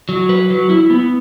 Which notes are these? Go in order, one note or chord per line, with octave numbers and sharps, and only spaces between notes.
F#3
B4
F#3
E4
B3